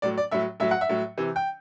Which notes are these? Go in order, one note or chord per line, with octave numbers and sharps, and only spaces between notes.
A2 F#3 D5
D5
A2 F#3 E5
A2 F#3 E5
F#5
E5
A2 F#3
C3 E3
G5